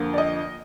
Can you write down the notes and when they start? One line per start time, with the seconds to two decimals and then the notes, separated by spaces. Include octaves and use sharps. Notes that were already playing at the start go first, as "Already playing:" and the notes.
Already playing: F2 D3 F3 A#3
0.13 D5
0.18 D#5